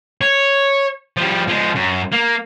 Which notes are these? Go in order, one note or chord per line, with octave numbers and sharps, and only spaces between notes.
C#5
F3 G3
F3 G#3
F#2
A#3